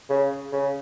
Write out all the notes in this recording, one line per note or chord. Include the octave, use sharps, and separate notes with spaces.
C#3
C#3